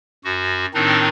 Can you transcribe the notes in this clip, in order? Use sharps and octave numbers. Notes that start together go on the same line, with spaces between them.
F#2 F#4
A2 D#3 C4 D4 D#4